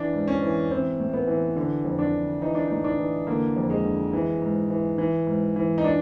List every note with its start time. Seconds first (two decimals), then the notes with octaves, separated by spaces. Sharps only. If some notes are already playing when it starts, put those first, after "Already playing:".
Already playing: E3 D4
0.13 G#2
0.28 C#4
0.42 E3
0.71 E3 C4
0.99 A2
1.13 B3
1.27 E3
1.57 D3
1.85 F2
1.99 D4
2.13 D3
2.41 E3 D#4
2.55 D4
2.68 D#4
2.71 A2
2.84 D4
2.99 E3
3.27 D3 A#3
3.57 F2
3.70 G#3
3.85 D3
4.13 E3
4.42 G#2
4.70 E3
4.98 E3
5.27 G#2
5.56 E3
5.78 D#4
5.84 D4